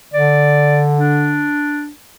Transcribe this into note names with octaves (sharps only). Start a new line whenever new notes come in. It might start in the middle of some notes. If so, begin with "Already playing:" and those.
D3 D5
D4